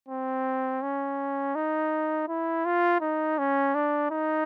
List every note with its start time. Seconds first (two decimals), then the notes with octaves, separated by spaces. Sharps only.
0.09 C4
0.82 C#4
1.55 D#4
2.28 E4
2.65 F4
3.01 D#4
3.38 C#4
3.75 D4
4.10 D#4